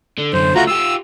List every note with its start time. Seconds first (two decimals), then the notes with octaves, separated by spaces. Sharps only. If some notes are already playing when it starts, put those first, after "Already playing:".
0.18 D3
0.33 F#2 D3 C5
0.55 C#2 A3 F4 F#4 A#5
0.67 F4 G4 E6